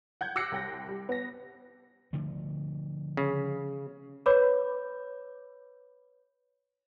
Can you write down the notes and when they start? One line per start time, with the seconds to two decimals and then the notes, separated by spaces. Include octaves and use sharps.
0.21 F#5 G6 G#6
0.36 D6 E6 F#6 A#6 C7 C#7
0.52 C2 G5 A#6
0.88 G3
1.09 B3 A#6
2.13 D3 F3 A3
3.17 C#3
4.26 B4 C#5 B5 D6 G6